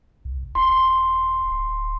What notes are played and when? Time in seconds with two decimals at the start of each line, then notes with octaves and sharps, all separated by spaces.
0.25 C2
0.55 D#1 C6
1.50 D1